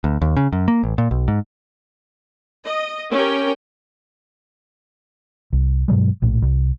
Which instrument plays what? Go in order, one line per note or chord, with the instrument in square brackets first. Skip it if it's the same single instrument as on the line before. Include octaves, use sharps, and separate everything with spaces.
[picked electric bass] D2
D#2
C#3
F#2
A#3
A1
A#2
B1
G#2
[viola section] D#5
C#4 G4 A#4 G5
[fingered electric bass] C2
G2 B2 F#3 G#3
A#1 A2
C2